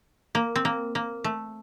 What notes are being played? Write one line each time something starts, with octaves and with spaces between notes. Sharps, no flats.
A#3
C4
A#3
A#3
A3